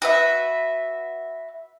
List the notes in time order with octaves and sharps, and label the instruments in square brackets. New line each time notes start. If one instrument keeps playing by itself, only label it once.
[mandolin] F#4 B4 E5